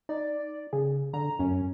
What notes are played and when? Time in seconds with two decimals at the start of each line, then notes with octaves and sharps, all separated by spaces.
0.09 D#4 D5
0.73 C#3 G#4
1.13 D3 A#5
1.39 F#2 C#4